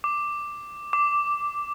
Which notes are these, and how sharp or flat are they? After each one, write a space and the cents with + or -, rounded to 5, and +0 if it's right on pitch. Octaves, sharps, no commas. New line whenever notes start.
D6 +5
D6 -5